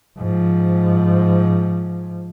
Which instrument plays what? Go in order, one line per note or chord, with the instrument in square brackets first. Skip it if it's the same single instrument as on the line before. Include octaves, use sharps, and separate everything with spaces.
[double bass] G#2 F3